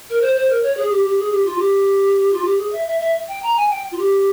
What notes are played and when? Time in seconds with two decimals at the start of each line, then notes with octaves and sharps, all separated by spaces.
0.10 A#4
0.21 C5
0.35 C5
0.49 A#4
0.63 C#5
0.77 G#4
0.91 G4
1.06 G4
1.19 G#4
1.32 G4
1.45 F4
1.58 G4
2.33 F4
2.44 G4
2.58 G#4
2.73 E5
2.87 E5
3.00 E5
3.28 G5
3.43 A#5
3.57 G#5
3.70 G5
3.92 F4
3.98 G4